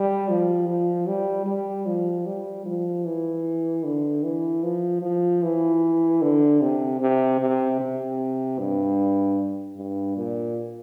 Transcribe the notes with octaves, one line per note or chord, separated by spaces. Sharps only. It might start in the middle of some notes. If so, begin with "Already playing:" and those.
Already playing: G3
F3
F3
G3
G3
F3
G3
F3
E3
D3
E3
F3
F3
E3
D3
C3
C3
C3
C3
G2
G2
A#2